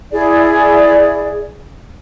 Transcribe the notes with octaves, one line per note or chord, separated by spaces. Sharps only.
E4 G#4 D5